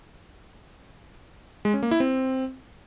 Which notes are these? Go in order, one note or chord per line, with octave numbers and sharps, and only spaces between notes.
G#3
C#4
A#3
E4
C4